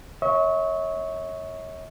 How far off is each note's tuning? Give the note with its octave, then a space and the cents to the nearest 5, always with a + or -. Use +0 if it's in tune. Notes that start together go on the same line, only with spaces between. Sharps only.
C#5 +0 E5 -45 C#6 +0